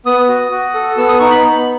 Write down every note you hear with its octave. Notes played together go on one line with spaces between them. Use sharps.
B3 D#6
F#4
F#4
A4
B3 E6
D#6
D#4 C#6
B5
B3